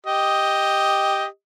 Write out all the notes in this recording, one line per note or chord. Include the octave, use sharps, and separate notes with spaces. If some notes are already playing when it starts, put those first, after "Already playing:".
G4 D#5